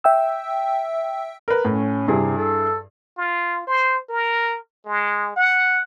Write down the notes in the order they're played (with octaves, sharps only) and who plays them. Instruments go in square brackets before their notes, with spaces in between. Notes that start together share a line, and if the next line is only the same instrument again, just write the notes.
[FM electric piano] E5 G5 E6
[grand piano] A#4 B4
[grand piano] A2 [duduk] C#4
[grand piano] G2 E4 G#4 [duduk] C3
[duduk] A4
[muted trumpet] F4
C5
A#4
G#3
F#5